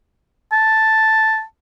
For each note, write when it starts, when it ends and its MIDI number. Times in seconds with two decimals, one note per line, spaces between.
0.52 1.42 81